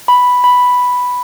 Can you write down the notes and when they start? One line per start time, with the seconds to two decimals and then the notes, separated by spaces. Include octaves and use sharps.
0.08 B5
0.44 B5